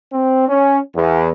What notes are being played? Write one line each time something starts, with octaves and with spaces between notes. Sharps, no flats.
C4
C#4
E2